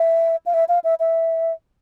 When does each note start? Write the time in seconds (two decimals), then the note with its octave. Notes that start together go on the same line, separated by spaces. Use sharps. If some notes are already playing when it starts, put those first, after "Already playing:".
Already playing: E5
0.46 F5
0.54 E5
0.69 F5
0.84 E5
1.00 E5